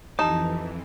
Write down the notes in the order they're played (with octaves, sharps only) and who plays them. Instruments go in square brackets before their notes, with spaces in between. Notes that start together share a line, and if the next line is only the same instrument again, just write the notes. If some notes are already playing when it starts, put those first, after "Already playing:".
[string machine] F2 E3 [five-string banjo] D#4 [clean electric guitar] G4 A5